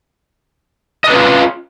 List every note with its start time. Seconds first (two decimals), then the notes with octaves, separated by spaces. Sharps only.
1.04 D#5
1.07 D4
1.10 B4
1.13 C#4
1.15 F4